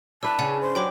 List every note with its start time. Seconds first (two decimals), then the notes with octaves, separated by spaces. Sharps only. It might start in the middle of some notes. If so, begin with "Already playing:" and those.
0.23 D4 E4 B4 A5 E6
0.39 C#3 D5 F#5 G#5
0.61 C5
0.75 F#3 D4 G4 G5 B5 D6